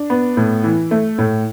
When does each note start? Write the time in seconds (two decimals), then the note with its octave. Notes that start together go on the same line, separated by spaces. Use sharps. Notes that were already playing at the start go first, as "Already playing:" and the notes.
Already playing: D4
0.10 B3
0.37 A2
0.64 E3
0.91 A3
1.18 A2